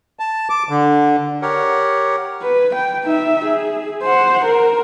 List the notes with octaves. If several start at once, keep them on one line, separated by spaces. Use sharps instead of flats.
A5
D6
D3
G4 A#4 C#5 F#5
B4
G5
D#4 E5
G#4
C5 F#5
A#4